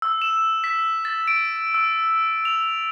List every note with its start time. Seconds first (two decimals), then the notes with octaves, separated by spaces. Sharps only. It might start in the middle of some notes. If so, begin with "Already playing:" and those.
0.02 E6
0.22 E7
0.64 B6
1.05 A6
1.28 D7
1.74 E6
2.45 F7